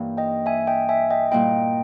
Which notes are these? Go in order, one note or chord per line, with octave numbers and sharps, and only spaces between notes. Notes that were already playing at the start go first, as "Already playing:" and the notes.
Already playing: G2 E3 A#3 D#4
D#5 G5
E5 G#5
D#5 G5
E5 G#5
D#5 G5
A#2 G3 A#3 E4 D#5 G5